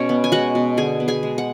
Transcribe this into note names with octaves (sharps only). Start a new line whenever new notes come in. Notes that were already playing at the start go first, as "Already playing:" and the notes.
Already playing: B2 G#3 C#4 C#5
B3
G#5
G#3 F#4 F#5
B2
D3 G#4 G#5
B3
G#4 G#5
G#3
F#5